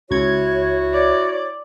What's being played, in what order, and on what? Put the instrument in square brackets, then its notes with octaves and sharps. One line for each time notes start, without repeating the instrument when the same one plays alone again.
[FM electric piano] C#2 G#6 [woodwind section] E4 F#4 C#5
[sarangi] D5